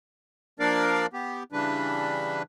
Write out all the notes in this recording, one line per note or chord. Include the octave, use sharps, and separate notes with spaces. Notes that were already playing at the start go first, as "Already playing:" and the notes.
F3 A#3 D4 A#4 D5 F5
B3 G4
C#3 E3 G3 D4 B4